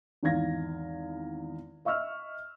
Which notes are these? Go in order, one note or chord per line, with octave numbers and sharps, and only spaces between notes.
G#1 E2 D#4 F5 G#6 A#6
D#5 E5 C#6 E6 F6